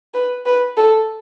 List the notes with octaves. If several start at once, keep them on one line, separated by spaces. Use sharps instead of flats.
B4
B4
A4